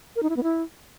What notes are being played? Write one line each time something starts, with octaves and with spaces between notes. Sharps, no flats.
A#4
D#4
E4
B3
E4